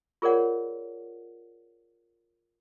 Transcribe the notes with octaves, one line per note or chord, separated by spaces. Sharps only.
F4 G#4 A#4 C#5 D5 F#5